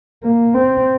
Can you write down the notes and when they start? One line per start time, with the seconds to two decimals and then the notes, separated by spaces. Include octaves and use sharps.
0.24 A#3
0.55 C4